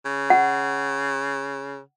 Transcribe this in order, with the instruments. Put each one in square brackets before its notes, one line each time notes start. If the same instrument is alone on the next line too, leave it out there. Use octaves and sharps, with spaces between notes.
[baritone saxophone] C#3
[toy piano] F#5